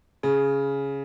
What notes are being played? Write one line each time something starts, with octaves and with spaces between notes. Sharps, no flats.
C#3